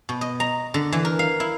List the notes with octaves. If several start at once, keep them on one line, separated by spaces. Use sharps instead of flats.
B2
D#5
A#5
D3
E3
A#4
F5
E4